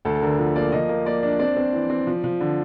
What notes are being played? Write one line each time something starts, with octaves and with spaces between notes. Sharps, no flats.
D2 A4
A4
D3 A#4
F3 A4
A#3 D5
F3 D#5
A#3
A#3 D5
D4
C4 D5
C4
E3
C4
F3
F3
D3